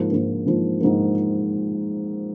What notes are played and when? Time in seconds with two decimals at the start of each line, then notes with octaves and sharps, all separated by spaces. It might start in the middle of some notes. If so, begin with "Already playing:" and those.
Already playing: G#2 F3 A#3
0.11 G#2 F3 A#3
0.46 G#2 F3 A#3
0.81 G#2 F3 A#3